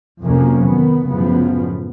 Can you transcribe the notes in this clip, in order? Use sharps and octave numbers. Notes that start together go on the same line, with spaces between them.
F2 C3 F3 F#3 A#3 C#4
D#3 B3
F#2 A2 C#3 F3 B3